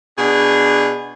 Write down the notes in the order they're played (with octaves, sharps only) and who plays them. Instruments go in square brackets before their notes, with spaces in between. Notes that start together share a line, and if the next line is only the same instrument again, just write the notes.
[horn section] B2 D4 G#4